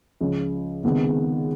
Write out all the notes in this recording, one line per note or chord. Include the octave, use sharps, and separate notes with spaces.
C#2 C#3 F3
C#2 C3 D#3 G#3 B3